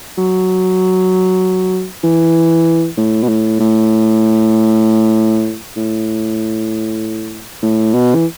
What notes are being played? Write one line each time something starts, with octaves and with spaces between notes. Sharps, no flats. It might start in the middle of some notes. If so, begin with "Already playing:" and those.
F#3
E3
A2
B2
A2
A2
A2
A2
B2
E3